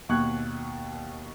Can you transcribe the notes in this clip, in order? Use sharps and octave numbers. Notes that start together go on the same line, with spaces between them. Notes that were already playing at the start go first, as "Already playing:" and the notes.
D#2 B2 C#6 F#6 G#6